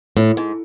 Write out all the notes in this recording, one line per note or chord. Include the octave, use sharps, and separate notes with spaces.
A2
G#2